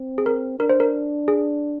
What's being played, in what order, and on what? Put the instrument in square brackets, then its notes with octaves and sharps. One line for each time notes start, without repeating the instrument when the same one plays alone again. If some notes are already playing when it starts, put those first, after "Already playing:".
Already playing: [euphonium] C4
[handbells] G#4
A#4
[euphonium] D4 [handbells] A#4
[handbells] C5
A#4
G#4